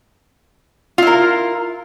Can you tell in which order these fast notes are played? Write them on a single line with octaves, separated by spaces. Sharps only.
F4 E4 A#4